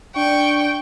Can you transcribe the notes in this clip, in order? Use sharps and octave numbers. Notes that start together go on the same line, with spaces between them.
D4 G5 C#6